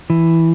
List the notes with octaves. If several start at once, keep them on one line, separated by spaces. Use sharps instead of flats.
E3